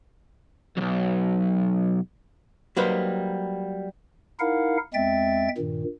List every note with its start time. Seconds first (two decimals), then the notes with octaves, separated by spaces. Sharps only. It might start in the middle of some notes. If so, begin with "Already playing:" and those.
0.77 B1 F2
2.76 F#3 G3 A#3 D#4 B4 C5
4.40 D#4 E4 A#4 F5 F#5
4.94 E2 G#3 C4 E5 G5 A6
5.57 G2 A#2 D#3